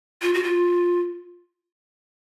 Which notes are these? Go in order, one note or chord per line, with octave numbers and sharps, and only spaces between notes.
F4
F#4
F4